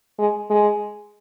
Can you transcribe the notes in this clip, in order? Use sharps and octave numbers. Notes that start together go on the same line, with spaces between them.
G#3
G#3